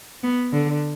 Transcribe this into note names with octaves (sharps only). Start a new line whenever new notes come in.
B3
D3